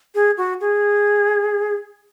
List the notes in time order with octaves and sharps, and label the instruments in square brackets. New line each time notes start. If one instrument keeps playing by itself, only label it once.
[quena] G#4
F#4
G#4